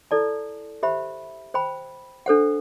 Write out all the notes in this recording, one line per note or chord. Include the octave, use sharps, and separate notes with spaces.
E4 A4 D5 A5
G4 C5 E5 B5
C5 G5 B5
D4 A4 C5 F#5